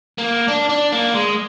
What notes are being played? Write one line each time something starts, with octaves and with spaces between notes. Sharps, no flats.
A#3
D4
D4
A#3
G#3